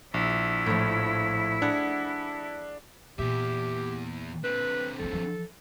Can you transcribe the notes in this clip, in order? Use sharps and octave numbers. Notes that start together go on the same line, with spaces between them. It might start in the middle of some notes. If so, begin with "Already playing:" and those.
A#1 E4
A2 F3
D4 G#4 F#5 B5
E2 A#2 G4 E5
D3 C4 B4
F3 D#4 A4
E3 F3